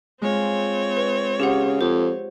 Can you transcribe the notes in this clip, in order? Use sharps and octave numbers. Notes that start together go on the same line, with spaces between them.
G#3 C4 F4 C#5
B4
C#3 G4 G#4 F#5
F2 C5